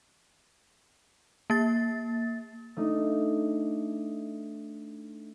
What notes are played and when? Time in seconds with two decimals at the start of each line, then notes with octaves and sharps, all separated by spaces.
1.50 A#3 A6
2.77 A3 D4 D#4